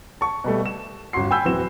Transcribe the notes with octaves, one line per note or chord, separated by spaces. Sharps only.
A5 C#6
B2 G3 A3
E7
G1 F#2 F#4 C6 C7
G5 G#5 B5 E6 G6
D1 E3 C4 F#4 E7